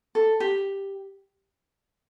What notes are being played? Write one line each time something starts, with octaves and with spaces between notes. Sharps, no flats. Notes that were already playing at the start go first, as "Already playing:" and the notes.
A4
G4